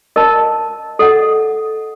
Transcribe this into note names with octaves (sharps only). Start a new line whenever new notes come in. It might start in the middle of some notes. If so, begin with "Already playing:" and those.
A#4 D#5 A5
A4 D#5 F#5